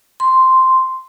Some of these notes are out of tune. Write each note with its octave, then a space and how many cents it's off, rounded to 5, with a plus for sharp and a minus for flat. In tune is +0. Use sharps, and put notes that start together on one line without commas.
C6 -5